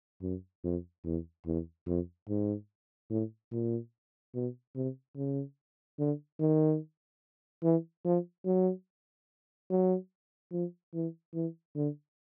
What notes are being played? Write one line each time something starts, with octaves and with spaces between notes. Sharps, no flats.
F#2
F2
E2
E2
F2
G#2
A2
A#2
B2
C3
C#3
D3
D#3
E3
F3
F#3
F#3
F3
E3
E3
D3